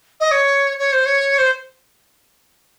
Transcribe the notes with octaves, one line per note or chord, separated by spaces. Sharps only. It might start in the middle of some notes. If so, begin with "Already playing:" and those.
D#5
C#5
C#5
C5
C#5
C5